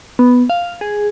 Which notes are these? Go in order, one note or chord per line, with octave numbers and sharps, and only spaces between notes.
B3
F5
G#4